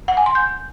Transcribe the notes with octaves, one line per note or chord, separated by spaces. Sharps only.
F#5
G#5
C6
G6